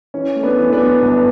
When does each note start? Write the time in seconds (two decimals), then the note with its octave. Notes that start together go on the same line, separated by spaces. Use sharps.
0.14 E3 C#4
0.36 A3
0.43 B3 D4
0.58 E3
0.73 B3 D4
0.80 F#2
1.02 G1